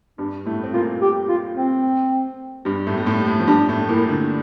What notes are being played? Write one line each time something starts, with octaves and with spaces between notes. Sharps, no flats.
G2 G3 D4
A2 A3 E4
C4
A#2 A#3 F4
G4
F4
C4
G2 G3
A2 A3
G3
A2 A3
A2 A3
F3
G2 G3 D4
A2 A3
A#2 A#3 E4
D3 D4